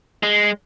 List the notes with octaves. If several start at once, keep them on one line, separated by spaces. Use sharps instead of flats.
G#3